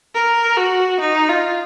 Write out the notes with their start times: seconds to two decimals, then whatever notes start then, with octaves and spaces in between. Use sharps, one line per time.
0.15 A#4
0.57 F#4
1.00 D#4
1.29 F4